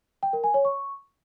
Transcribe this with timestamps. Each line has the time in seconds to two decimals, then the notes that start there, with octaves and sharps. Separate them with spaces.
0.23 G5
0.33 A#4
0.44 G#5
0.54 C#5
0.65 C#6